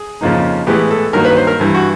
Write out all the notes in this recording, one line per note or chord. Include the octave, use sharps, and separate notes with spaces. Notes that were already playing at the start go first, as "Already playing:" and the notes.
Already playing: G#4
F2 C#3 F3 A#3 D#4
A2 E3 G#3 B3 G4
A4
G2 D#3 F#3 A#3 A#4
B4
C5
A#4
G2 E3 G3
F#4